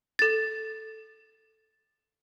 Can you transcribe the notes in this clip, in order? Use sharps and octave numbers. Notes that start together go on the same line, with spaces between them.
A4 A6